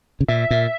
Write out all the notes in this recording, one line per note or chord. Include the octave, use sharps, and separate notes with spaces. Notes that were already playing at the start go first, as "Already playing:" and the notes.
C#3
A#2 E5
A#2